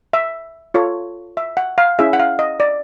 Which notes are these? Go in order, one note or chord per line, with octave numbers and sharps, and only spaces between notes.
E5
F4 A4 C#5
E5
F#5
F5
C#4 E4 G#4 E5
F#5
F5
D#5
D5